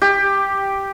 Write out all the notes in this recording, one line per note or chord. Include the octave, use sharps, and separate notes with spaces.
G4